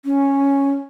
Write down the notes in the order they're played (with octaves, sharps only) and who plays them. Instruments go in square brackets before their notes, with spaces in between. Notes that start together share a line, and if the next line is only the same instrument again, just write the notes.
[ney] C#4